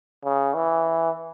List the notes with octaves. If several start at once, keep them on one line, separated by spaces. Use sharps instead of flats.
C#3
E3